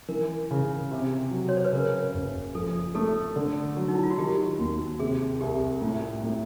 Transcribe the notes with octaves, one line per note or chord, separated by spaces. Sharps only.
E3 A#4
C#3
C3
F#3
C#5
C5
B4
C#3 A#4
F#1
F3 A4
A3 A4
D3
F#3
D#4
E4
F4
F#4
D#3 G4
D#2 F#4
C3 G#4
C2 G4
A2 F4
A2